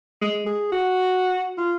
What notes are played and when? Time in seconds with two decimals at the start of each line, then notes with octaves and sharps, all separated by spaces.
0.21 G#3
0.46 G#4
0.72 F#4
1.58 F4